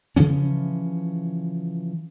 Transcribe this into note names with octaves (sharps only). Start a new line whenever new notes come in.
C#3 E3 F3 C#4